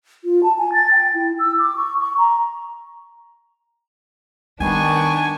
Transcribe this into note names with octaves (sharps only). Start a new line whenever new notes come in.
F4
A5
G#5
A6
G5
E4
E6
D6
C#6
C#6
A#5
D#3 G3 B3 D4 G#5 C#6